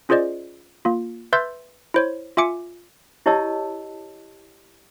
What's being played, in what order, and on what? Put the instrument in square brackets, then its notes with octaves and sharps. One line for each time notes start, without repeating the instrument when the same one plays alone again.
[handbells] C#4 F4 G#4 C5 D5 D#5
A#3 F4
B4 E5 C6 E6 G6 A6
E4 C5 C#5
F4 E5 G#5 D6 C#7
[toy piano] E4 G4 C#5 D#5 A5 E6